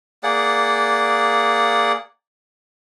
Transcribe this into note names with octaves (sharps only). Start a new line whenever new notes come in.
A#3 G#4 D5 F#5